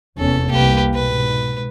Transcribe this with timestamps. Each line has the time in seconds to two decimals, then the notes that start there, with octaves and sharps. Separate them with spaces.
0.18 F1 E2 C#4 A4
0.51 C2 A#3 G4 B4
0.94 G#2 B2 B4